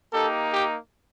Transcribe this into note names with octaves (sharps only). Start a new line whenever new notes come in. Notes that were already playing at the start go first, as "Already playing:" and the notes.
A#3 D#4 G4 A4
G4